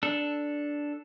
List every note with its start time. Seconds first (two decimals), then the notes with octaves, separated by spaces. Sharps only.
0.03 D4 A4